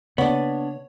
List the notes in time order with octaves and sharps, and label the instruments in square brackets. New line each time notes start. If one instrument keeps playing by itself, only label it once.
[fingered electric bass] C#3 A#3 [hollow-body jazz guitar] B3 D4 [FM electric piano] C#5